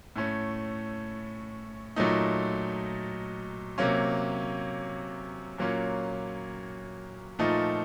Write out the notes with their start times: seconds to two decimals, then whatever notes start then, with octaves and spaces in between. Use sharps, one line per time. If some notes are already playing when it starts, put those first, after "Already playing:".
0.16 A2 A3 C#4
1.96 A#2 F#3 A3 D#4
3.78 C3 F#3 A#3 C#4
5.58 A#2 F#3 A#3 C#4
7.39 A#2 F3 A3 D#4